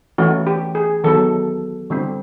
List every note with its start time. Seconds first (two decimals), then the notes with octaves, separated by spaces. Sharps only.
0.18 E3 A3 C#4 F#4
0.47 G4
0.75 G#4
1.04 D#3 F#3 B3 A4
1.90 D3 G3 C4